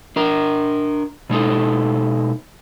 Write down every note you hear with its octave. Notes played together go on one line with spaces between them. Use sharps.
D4 A#4
B2 G#3 D#4 A4